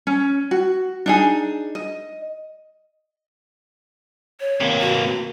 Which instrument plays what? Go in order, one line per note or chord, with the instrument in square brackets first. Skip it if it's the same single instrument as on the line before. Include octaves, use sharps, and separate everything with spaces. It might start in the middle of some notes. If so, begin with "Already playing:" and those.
[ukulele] C#4
F#4
D4 D#4 G#4
D#5
[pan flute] C#5
[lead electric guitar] C3 A#3
[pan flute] F#4